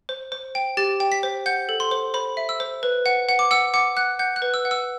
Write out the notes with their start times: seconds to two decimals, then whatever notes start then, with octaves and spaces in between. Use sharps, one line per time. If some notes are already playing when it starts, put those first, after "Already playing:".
0.09 C5
0.32 C5
0.55 G5
0.77 G4 A6
1.00 G5
1.12 B6
1.23 C5
1.46 F#5 G6
1.69 A4
1.80 C6
1.91 C5
2.14 C5 B5
2.37 E5
2.49 E6
2.60 C5
2.83 B4
3.06 F#5
3.29 F#5
3.39 D6
3.51 F#5 E6
3.74 F#5 D6
3.97 F#5 F#6
4.19 F#5 G6
4.36 F#6
4.42 B4
4.54 E6
4.65 F#5
4.71 E6